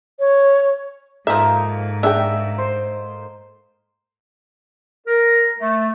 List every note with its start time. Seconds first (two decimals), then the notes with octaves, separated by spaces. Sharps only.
0.19 C#5
1.27 G#2 F3 A#3 D#4 A4 E5
2.03 D4 G#4 E5 G5
2.58 C5
5.06 A#4
5.59 A3